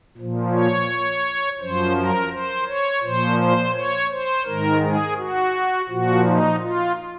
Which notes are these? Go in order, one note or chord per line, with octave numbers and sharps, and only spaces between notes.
A#2 F3
C#5
F#2 F3 C5
A#4
C5
C#5
A#2 F3 C5
C5
C#5
C5
G#2 D#3 A#4
G#4
F#4
A#2 F3 F#4
D#4
F4